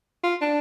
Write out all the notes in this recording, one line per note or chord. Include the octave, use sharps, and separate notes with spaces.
F4
D4